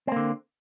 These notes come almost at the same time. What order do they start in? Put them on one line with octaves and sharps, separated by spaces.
C4 A#3 D3